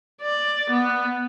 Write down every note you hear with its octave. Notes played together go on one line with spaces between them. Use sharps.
D5
B3